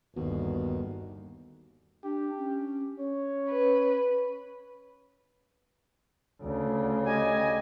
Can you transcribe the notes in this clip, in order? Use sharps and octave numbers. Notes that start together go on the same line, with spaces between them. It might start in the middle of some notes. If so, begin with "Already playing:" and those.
G1 D#2 B2
D4 G4
C#4
C#4 C#5
B4
D2 C#3
G4 D#5 G#5